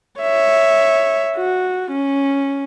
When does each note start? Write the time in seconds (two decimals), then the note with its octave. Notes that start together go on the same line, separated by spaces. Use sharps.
0.21 C#5 E5
1.37 F#4
1.92 C#4